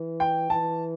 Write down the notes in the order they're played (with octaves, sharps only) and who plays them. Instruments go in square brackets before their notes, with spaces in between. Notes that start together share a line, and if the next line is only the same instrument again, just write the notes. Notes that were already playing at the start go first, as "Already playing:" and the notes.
Already playing: [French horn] E3
[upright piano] G5
[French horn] E3 [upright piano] A5